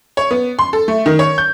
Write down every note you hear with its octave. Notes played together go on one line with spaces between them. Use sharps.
C#5
B3
C6
A4
A3
D#3
C#5
G6